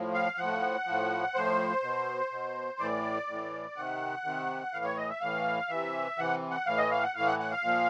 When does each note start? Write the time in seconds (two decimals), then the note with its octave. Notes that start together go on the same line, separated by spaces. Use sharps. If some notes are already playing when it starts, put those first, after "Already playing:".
Already playing: A2 F3
0.14 F5
0.38 A2 F3 F#5
0.86 A2 F3
1.35 A2 F3 C5
1.82 B2
2.31 B2
2.79 A2 E3 D5
3.28 A2 E3
3.76 C3 D#3 F#5
4.25 C3 D#3
4.72 A2 E3 F5
4.85 C#5
4.97 D#5
5.09 E5
5.21 A2 E3 F5
5.69 C3 E3 E5
6.18 C3 E3 F#5
6.51 F#5
6.66 A2 E3 F5
6.78 D#5
6.91 F5
7.03 F#5
7.14 A2 F5
7.20 E3
7.27 F#5
7.39 F#5
7.51 F5
7.63 A#2 F3